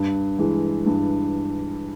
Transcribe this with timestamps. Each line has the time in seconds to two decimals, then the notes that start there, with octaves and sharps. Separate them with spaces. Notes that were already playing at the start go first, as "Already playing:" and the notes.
Already playing: G2
0.38 E3 G#3
0.86 G2